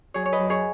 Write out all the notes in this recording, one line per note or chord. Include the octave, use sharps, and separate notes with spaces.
F#3 G#4 C#5
C#5
B4 D#5
F#2
G#4 C#5